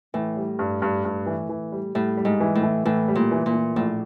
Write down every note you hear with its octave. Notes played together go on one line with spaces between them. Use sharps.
A2 E3
G3
G2
G2
G2
E3
E3
G3
A2 G3
G3
G#2
E3
A2
E3
A2 E3
G3
A#2
E3
A#2
E3
A#1 A2